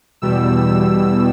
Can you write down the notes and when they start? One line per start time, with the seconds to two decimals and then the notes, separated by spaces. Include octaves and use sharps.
0.22 E2 B2 G3 E6
0.67 E6